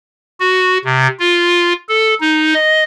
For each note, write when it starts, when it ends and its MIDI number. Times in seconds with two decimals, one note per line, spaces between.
0.40 0.78 66
0.85 1.08 48
1.19 1.73 65
1.89 2.14 69
2.20 2.54 63
2.54 2.84 75